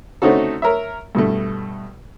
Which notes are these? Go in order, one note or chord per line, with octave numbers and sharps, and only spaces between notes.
A3 C4 C#4 D#4 F#4 A4
A#4 C#5 E5
G2 B2 A3